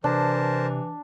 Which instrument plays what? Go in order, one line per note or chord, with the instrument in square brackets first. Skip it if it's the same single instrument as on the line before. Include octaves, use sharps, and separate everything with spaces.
[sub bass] C3 [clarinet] E3 [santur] D4 [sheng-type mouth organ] A#4 C5 A5